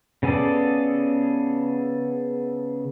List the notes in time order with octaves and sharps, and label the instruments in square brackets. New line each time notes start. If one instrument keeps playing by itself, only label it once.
[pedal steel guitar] C#3 B3 G#4 A4 D5